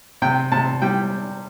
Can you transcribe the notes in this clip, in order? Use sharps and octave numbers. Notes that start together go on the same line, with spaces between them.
C3 G5
C3 A5
G3 G5